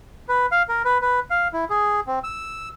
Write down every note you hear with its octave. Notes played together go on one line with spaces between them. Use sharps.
B4
F5
A#4
B4
B4
F5
E4
G#4
C4
E6